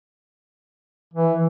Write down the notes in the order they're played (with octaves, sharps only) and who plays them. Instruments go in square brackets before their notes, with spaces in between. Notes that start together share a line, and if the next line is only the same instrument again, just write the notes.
[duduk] E3